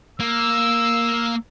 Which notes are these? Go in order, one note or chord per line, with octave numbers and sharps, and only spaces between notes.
A#3 E6